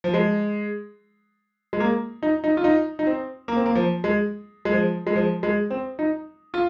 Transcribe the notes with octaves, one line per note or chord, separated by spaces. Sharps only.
F3
G#3
G#3
A#3
D#4
D#4
F4
D#4
D#4
C4
A#3
C4
A#3
F3
G#3
G#3
F3
G#3
F3
G#3
C4
D#4
F4